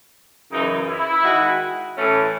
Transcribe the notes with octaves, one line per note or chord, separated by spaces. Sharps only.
F#2 C#3 E3 D#4
E4
D#3 G#3 D#4 F#4
A2 E3 A3 C#4